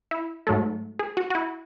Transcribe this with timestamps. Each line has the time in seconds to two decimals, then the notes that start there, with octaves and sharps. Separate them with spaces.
0.11 E4
0.47 G#2 F#3 A3
0.99 G#4
1.17 F#4
1.30 F#4
1.35 E4